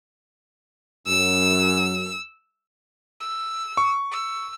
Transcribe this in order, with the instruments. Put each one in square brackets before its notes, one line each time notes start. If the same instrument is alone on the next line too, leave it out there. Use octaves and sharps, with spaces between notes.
[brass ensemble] F#2 [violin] E6
[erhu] E6
[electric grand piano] C#6
[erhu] E6